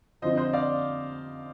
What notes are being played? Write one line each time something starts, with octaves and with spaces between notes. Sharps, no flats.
F2 D3 F3 C5 D#5
C5 D#5
D5 F5